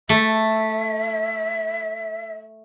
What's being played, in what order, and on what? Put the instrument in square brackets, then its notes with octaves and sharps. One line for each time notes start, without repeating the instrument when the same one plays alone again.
[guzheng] A3 [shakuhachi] E5